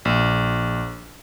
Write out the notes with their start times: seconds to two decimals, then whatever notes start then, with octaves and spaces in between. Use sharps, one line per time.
0.05 A#1